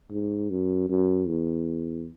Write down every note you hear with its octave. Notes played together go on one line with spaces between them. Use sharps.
G#2
F#2
F#2
E2